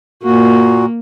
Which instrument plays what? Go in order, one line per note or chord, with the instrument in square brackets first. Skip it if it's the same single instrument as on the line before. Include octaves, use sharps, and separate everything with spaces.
[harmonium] A#2 F#4 [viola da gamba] A#3